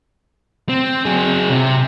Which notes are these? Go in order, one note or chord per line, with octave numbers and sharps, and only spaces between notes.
C4
F#3 G#4
C3